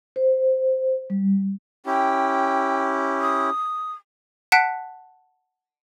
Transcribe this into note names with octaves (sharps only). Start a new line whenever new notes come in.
C5
G3
C#4 E4 G4 G5
D#6
F#5 A5 F#6 B6 D7